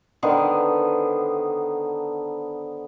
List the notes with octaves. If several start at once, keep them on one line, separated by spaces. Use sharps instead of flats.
D3 D#3 B3 C5